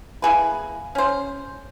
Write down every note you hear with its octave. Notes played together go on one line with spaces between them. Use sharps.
A#3 E4 G#4 B4
C#4 C5